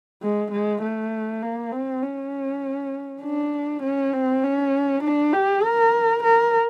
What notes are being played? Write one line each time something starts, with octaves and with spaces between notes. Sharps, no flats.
G#3
G#3
A3
A#3
C4
C#4
D4
C#4
C4
C#4
D4
G4
A#4
A#4